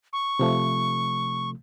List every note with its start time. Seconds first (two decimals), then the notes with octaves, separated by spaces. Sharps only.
0.13 C#6
0.39 C3 F3 A3